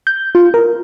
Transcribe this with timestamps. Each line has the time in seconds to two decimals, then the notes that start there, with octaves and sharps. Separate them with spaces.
0.07 G6
0.35 F4
0.54 A#4